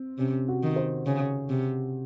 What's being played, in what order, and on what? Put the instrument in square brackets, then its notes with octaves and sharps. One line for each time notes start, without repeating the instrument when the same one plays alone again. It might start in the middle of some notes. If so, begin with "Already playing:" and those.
Already playing: [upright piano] C4
[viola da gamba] C3 [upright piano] C#4
[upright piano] F#4
[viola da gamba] D#3
[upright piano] C5
[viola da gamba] C#3
C3